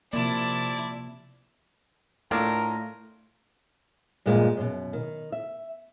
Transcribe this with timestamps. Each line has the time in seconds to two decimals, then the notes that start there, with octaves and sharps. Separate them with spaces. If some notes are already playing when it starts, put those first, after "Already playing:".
0.13 C3 F3 A#3 E4 D5 A5
2.31 A2 A3 D4 F4 A#4
4.26 G2 A#2 F3 G#3 B3
4.57 F#2 B2
4.93 D#3
5.32 E5